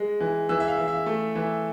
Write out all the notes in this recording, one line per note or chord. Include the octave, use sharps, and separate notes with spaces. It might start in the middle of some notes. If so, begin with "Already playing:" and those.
Already playing: G#3
E3
E3 E6
E5
F5
E3
E5
A3
E3